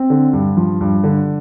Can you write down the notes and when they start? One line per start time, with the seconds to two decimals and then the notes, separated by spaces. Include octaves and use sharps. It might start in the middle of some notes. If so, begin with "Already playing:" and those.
Already playing: C4
0.10 D3
0.33 G2
0.57 F3
0.81 G2
1.04 D3